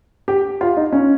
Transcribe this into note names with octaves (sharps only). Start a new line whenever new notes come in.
G4
F4
D#4
C#4